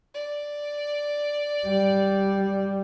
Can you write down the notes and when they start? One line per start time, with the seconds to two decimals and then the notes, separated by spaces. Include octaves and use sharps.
0.14 D5
1.67 G3